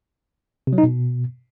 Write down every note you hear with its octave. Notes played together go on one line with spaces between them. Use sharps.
C3
F#3
D#4
B2